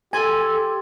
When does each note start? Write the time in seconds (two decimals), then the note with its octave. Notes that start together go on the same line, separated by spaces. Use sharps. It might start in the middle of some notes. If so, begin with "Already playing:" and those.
0.13 G4 A4 G#5 C6 G#6 A6